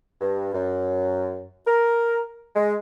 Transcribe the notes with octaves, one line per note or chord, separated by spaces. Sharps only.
G2
F#2
A#4
G#3